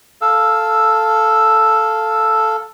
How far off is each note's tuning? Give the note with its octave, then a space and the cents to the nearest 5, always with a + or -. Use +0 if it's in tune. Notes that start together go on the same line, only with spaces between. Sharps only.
A4 +0 F5 +0 E6 +0